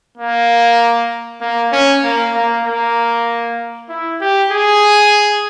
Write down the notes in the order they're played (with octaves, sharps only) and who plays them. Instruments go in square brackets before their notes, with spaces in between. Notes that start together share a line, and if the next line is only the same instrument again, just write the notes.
[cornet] A#3
A#3
C#4
A#3
A#3
A#3
E4
G4
G#4